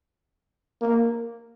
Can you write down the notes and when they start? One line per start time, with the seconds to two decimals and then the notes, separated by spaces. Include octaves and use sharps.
0.81 A#3